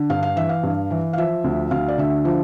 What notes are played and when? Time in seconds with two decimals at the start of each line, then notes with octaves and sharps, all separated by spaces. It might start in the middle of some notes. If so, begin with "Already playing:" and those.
Already playing: D3
0.10 G2 F5
0.23 F5
0.36 E3 E5
0.49 F5
0.63 G2
0.90 E3
1.13 F5
1.17 F3 E5
1.44 D2
1.71 D2 F5
1.88 D5
1.98 D3 E5
2.25 F3